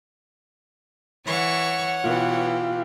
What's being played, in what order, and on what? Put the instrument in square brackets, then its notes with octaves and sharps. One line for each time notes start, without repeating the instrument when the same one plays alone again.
[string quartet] E3 C#6 E6 [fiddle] C#5 F#5
[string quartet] B2 E3 G4 [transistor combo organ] F4